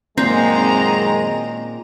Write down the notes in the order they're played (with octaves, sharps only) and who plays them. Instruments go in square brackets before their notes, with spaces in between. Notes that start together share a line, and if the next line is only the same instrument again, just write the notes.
[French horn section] F#2 D#3 G#3 [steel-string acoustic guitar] A#2 [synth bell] C4 [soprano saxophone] A#5